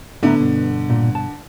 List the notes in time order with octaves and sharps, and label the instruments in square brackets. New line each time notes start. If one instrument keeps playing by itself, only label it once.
[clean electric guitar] A2 E5 A#5 [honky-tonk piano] D3 [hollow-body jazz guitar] B3
[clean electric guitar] G2 B2
[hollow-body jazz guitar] A#2
A5